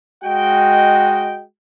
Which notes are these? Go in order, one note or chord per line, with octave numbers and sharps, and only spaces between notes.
G#3 F#4 D#5 G5